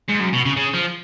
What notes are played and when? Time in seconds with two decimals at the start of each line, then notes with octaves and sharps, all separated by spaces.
0.08 G#2
0.20 F#2
0.33 B2
0.45 C#3
0.57 C#3
0.74 F3